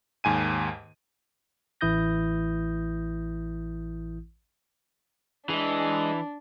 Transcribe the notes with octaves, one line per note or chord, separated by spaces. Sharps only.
D#2 G#2 G#5 D#7
A1 E3 E4 D#6 G6 A#6
E3 D4 G#4 D#5